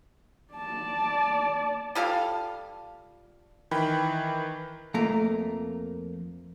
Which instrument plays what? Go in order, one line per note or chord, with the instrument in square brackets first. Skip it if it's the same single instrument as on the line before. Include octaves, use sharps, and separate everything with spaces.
[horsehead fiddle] D5 A5
[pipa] G3 F4 A4 F5
[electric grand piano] D#3 E3 G5 B5
[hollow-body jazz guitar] F2 A3 A#3 A#4 A#5